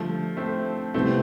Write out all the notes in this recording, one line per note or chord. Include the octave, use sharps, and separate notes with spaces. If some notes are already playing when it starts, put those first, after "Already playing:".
Already playing: D3 F3 G3 A3 D4 A4 C5
A3 C4
C3 G3 A3 B3 C4 E4